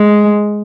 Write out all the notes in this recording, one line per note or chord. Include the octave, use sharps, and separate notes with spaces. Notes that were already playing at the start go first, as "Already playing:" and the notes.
Already playing: G#3